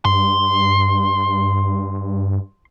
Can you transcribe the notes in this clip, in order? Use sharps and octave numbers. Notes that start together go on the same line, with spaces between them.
G2 C6